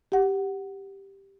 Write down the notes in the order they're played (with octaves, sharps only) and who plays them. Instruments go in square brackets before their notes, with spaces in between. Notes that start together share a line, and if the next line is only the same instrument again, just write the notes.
[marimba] G4 F#5